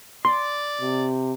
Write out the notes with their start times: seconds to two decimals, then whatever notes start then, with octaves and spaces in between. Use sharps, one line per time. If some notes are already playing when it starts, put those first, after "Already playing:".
0.25 D5 C6
0.81 C3